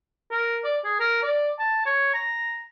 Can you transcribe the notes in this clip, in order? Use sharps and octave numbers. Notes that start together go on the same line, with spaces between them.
A#4
D5
G#4
A#4
D5
A5
C#5
A#5